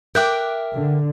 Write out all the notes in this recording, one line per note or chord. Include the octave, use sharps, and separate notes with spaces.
A#4 E5 G5 D6 F#6 G6
D3